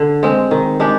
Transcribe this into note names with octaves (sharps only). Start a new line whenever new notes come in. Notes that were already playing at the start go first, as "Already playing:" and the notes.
Already playing: D3
G#3 C4
D#3
G#3 D4 G4